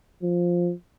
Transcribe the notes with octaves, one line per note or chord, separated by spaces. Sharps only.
F3